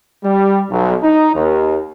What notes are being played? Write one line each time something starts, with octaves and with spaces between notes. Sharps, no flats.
G3
B1
D#4
D#2